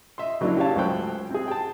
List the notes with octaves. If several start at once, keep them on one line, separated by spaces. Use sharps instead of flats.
D#5 E5 C6
C#3 F#3 A#3 D4 E4
C#4 G4 C#5 F5 A5
C#2 F#3 A3 C5 G5 F#6
C4 G#4
G5 A5